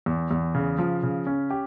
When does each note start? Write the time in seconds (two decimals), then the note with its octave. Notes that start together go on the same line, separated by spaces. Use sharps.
0.06 E2
0.31 E2
0.55 C#3
0.78 F3
1.03 C#3
1.27 C#4
1.50 G4